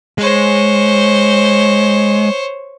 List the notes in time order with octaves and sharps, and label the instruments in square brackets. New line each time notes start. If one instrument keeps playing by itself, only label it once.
[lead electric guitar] G#3 [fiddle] C5 C#5